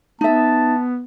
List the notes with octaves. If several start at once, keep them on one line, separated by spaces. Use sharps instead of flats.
B3 D#4 E5 A5